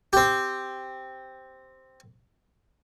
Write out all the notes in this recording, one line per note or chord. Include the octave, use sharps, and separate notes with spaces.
C4 G4